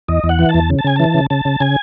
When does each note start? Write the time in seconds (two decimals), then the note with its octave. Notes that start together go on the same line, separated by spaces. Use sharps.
0.08 E2 D#5
0.24 E2
0.29 F#5
0.39 E3
0.49 A5
0.54 E2
0.70 C#3
0.79 A5
0.85 C#3 G#5
0.96 E3 A5
1.14 C#3
1.30 C#3 A5
1.45 C#3
1.60 C#3 G#5